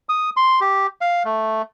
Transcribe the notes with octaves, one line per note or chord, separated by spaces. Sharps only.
D#6
C6
G4
F5
A3